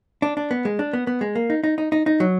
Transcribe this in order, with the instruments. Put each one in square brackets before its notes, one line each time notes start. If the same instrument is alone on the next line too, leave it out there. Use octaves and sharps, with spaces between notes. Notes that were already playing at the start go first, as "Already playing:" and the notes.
[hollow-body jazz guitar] D4
D4
B3
G#3
D4
B3
B3
G#3
A#3
D#4
D#4
D#4
D#4
D#4
F#3